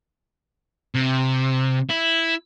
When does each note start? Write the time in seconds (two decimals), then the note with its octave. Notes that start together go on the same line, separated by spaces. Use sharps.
0.95 C3
1.89 E4